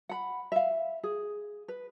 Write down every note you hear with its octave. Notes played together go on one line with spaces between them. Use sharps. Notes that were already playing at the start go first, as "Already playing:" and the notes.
F#5 B5
E5 F5
G#4
B4